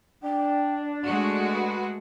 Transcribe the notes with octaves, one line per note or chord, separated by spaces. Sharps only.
D4 G5
G#3 A3 F#4 C#6
B4